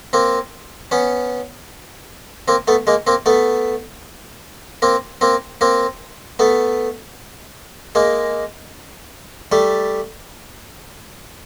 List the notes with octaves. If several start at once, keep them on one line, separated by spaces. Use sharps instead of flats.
A#3 C4
B3 C#4
A#3 C4
A3 B3
G#3 A#3
A#3 C4
A3 B3
A#3 C4
A#3 C4
A#3 C4
A3 B3
G#3 A#3
G3 A3